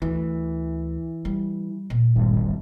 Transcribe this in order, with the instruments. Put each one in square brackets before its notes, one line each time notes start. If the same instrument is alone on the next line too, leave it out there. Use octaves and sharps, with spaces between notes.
[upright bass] D2 [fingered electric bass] E3
[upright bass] G3
A#2
[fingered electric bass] D1 G#1 G2